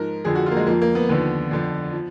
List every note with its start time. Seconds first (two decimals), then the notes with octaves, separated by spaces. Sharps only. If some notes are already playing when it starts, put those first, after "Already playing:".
Already playing: G#2 F3 A#4
0.25 F2 D3 F3 G#4
0.35 F#4
0.46 F4
0.51 A#3
0.57 G#3
0.67 F2 F3 A#3
0.82 A#3
0.95 B3
1.09 D#2 D3 F3 B3
1.51 F2 D3 F3
1.93 F3